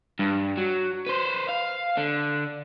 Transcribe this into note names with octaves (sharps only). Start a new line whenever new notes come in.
G2
F#3
B4 C5
F5
D3